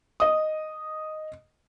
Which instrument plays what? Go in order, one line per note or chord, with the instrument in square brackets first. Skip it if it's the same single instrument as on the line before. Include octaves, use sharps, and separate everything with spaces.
[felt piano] D#5 D#6